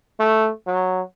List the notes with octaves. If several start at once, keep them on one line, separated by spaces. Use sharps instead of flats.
A3
F#3